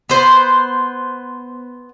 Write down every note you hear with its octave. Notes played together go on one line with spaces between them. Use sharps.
B3 C5